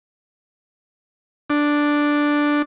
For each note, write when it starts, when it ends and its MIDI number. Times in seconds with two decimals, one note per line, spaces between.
1.50 2.62 62